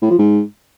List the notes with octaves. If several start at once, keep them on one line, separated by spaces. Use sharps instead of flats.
A2
F3
G#2